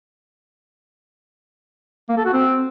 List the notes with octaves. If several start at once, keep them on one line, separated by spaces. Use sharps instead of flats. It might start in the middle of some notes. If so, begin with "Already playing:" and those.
A#3
A4
F#4
C4